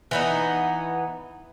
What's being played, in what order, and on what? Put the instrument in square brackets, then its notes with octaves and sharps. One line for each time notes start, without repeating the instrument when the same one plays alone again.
[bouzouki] E3 B3 D#4